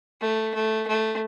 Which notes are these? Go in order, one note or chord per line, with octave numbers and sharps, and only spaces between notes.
A3
A3
A3